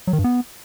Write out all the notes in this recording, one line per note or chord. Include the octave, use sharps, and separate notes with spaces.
F#3
D#3
G2
B3